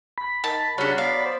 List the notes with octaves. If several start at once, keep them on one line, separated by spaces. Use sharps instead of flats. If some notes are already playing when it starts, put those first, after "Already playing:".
B5
D#3 A5
C#3 F#3 G3 C#4 D4 F#5
B3 D5 F5
C5